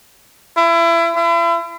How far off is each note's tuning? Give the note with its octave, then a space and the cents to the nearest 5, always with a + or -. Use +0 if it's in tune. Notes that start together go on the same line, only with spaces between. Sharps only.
E4 +30
E4 +40